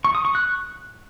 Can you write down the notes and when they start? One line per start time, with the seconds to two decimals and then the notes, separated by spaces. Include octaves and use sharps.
0.05 C#6
0.15 D#6
0.25 C#6
0.35 F#6